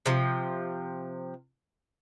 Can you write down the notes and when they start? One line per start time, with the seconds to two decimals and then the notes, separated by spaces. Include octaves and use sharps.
0.06 C3 F3